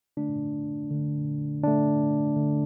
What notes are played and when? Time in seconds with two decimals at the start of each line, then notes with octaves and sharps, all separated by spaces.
0.17 D3 A3 D4
0.90 D3 A3
1.63 D3 A3 D4
2.36 D3 A3